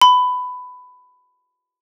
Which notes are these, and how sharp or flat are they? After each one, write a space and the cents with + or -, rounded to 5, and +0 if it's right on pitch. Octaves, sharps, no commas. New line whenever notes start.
B5 +15